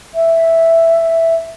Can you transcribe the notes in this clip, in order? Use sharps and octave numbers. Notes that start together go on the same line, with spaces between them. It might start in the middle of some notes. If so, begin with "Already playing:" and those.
E5